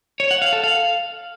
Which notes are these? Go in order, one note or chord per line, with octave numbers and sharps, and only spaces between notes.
C#5
F#5
F5
A4
F5